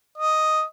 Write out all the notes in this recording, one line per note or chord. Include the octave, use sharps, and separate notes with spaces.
D#5